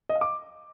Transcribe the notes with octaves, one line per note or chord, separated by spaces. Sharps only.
D#5
F5
D6